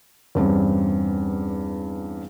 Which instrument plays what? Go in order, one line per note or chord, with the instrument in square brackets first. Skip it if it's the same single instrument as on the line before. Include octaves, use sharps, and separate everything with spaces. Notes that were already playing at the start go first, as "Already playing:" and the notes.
[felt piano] E2 G2 C4 C#4